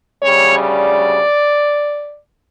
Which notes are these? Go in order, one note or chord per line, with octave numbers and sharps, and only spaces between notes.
D2 C#3 G3 C#5
D5